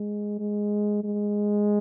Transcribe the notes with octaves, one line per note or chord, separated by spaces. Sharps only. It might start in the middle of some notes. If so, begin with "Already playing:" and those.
Already playing: G#3
G#3
G#3